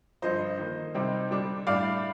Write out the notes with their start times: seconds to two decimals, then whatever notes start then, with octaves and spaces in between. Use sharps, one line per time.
0.22 G2 D3 F3 C5 D#5
0.58 D#3 A#3 D#4
0.94 C3 G3 C4 D#4
1.31 D3 G3 D4
1.67 A2 G3 D4 D5 F5